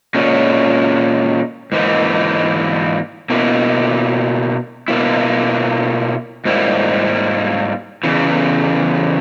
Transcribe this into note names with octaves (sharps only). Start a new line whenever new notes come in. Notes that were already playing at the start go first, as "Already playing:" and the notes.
A#2 G#3 C#4
G#2 E3 A#3 D#4
B2 A#3 E4
B2 A#3 E4
G#2 G3 A#3 E4
E2 C#3 E3